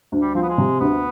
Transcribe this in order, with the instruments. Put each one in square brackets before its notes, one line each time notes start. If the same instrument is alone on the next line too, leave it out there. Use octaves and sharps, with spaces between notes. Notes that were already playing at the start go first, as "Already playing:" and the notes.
[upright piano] D2
[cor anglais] G3
[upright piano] F3 [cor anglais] C4
[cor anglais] B3
G#3
[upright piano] C3
[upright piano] D2 [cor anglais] B3